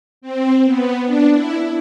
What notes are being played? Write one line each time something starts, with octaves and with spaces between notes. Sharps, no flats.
C4
B3
D4
E4